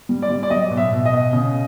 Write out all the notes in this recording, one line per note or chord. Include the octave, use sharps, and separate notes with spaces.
G3
D5
G3
D5
F#3 D#5
B2
E5
B2
D#5
B2
C#3